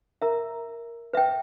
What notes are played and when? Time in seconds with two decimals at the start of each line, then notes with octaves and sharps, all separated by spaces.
0.22 A#4 E5 A#5
1.13 B4 E5 G5